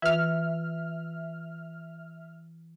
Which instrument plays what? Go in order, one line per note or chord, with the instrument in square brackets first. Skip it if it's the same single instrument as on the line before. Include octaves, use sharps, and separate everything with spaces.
[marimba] E3 F4 B4 [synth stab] E5 F6